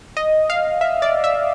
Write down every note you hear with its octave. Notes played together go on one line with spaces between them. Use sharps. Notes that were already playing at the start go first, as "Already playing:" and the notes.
D#5
F5
E5
D5
E5